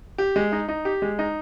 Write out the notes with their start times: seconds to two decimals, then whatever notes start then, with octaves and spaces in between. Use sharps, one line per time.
0.18 G4
0.36 G#3
0.52 D#4
0.68 D#4
0.85 G4
1.02 G#3
1.19 D#4